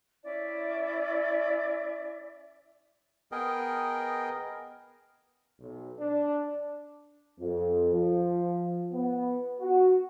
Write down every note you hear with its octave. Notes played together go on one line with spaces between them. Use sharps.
C#4 E4 D5 E5
B3 G#4 A#4 D#5 G5
B1
D4
F2
F3
B3
F#4